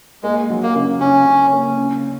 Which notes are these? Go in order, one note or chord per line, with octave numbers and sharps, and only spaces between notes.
G#3 A#3
F#3
A#3
C#3
C#3 C#4
C#3
A#3
C#3